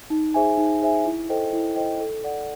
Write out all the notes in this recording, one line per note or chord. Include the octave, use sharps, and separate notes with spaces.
D#4
G#4 C5 E5 G#5
D#4
G#4 C5 E5 G#5
E4
A4 C5 D#5 G5
E4
A4 C5 D#5 G5
A4
D5 F#5